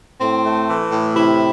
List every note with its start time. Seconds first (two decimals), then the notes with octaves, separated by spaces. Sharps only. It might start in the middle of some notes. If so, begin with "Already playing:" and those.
0.21 A2 C4
0.44 A3
0.68 E3
0.90 A2
1.15 C3 E4